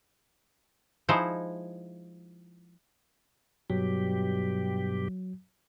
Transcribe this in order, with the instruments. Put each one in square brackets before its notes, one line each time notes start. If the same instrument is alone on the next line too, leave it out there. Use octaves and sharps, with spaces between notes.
[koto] F3 G#3 D#4 E4 C5
[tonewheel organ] G2 B2 G4 [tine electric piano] F#3